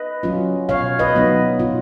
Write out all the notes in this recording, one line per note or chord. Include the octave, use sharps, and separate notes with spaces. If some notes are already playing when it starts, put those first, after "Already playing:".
Already playing: B4 D#5
F#3 C#4 F4
B2 C#5 F5
B4 D#5
F#3 B3 D#4
B2 F4